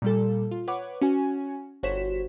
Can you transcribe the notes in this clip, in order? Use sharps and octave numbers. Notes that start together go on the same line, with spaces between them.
A#2 G3 A4
F4
B4 C#5 F#5 D6
C#4 F#4 G#5
G1 F#4 C5 C#5 B6 E7